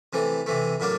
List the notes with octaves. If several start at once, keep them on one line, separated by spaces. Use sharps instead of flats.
C3 E3 A3
C3 E3 A3
A2 F#3 A#3 D4